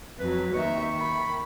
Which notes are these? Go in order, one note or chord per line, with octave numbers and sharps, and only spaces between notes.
F2 F#3 B4
D#2 D#4 E5 C#6
D#3 B5